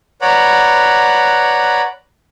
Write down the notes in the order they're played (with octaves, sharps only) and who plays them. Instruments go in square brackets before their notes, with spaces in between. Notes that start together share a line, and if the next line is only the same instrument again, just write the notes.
[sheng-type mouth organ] B4 C#5 D5 F#5 A#5 B5